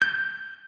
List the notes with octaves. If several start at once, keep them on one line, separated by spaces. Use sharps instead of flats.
G6